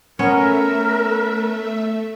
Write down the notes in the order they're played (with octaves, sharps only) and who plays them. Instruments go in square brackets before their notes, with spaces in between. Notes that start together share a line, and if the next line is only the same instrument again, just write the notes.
[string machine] A3 E5 [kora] B3 C#4 C#5 [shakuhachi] A#4